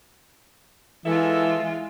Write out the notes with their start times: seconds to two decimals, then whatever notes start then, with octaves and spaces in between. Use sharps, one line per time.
1.06 E3 G#3 F4 A4 E5